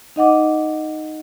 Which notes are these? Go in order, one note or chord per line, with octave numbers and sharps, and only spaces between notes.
D#4 D#5 F#5 D6